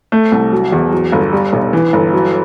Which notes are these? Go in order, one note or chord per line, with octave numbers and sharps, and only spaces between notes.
A3
C2
F#3
E2
F#3
G1
G3
B1
E3
G1
F#3